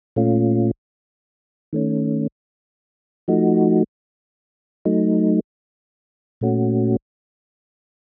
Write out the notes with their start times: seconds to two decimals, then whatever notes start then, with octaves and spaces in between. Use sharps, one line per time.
0.16 A#2 A3 C#4 F4
1.73 D#3 A3 C#4
3.28 F3 A3 D#4 F#4
4.85 F#3 A3 D#4
6.41 A#2 A3 C#4 F#4